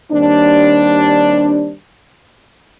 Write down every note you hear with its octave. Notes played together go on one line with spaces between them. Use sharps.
D#2 G3 C4 D4